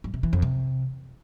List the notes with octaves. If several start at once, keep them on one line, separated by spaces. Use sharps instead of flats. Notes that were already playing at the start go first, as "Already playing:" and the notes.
G2
C3
E3
F2
C3